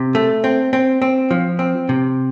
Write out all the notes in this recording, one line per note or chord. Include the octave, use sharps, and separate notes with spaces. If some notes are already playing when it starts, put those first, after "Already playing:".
Already playing: C3
A3
C4
C4
C4
F3
C4
C3